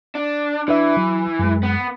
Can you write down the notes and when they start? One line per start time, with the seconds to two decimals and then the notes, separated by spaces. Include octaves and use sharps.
0.15 D4
0.68 E3 D4 B4 E5
0.97 F#3
1.39 F#2 G#3
1.63 B3